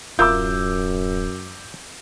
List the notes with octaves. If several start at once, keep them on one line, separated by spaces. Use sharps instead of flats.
D1 F#2 F4 A#4 E5 D6 E6 G6